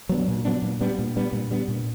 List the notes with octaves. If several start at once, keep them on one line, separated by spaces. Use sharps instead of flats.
F#3 B3 D4
A#2
F#3 B3 D4
A#2
G3 B3 D4
A#2
G3 B3 D4
A#2
G3 B3 D4
A#2